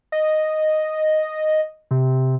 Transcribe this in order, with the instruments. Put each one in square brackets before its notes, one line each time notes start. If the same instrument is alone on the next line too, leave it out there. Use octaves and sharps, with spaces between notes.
[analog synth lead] D#5
C3